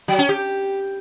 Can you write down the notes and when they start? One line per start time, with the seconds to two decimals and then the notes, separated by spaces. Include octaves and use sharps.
0.08 F#3
0.19 C#4
0.29 G4